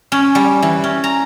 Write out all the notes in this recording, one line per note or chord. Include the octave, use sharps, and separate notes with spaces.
C#4
G3
E3
C#4
A#5